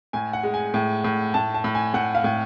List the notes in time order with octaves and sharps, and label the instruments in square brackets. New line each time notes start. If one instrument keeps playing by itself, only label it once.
[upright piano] A2 G#5
F#5
G#3
G#5
A2
A2
A2 A5
A5
A2
G#5
A2 F#5
F5
A2